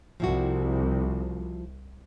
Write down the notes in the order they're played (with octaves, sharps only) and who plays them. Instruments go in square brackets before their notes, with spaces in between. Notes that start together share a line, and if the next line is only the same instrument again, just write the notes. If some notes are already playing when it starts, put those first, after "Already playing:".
[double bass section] C2 [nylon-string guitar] F3 E4 F#4